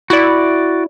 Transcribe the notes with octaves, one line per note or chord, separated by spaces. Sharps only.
E4 F#4 D5